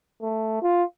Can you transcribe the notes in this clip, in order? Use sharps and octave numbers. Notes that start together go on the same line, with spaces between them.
A3
F4